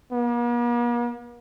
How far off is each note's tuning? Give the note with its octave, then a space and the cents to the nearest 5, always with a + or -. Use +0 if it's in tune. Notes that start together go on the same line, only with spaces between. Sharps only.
A#3 +45